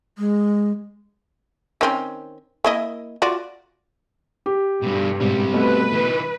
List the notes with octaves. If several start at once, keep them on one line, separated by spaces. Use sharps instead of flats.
G#3
D#3 C4 C#4
A#3 E4 D#5
F4 F#4 D5
G4
G2 B2 G3
G#2 B2 G3 C4
B2 A3 B4
E3 D#4